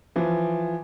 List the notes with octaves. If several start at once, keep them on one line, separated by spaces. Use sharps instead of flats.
E3 F3